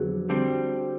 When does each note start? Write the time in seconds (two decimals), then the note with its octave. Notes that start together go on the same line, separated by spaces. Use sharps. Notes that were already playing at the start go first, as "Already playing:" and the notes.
Already playing: F2 D3 F#3 B3 F#4 G#4
0.29 D3 G3 C4